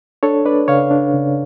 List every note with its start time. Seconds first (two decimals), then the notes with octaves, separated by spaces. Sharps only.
0.23 D4 A4 C#5
0.45 D4 B4 D5
0.68 C#3 C#5 F5
0.91 D4
1.14 C#3